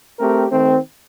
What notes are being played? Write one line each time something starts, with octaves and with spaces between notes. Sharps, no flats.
A3 C4 G4 A#4
D#3 A3 C4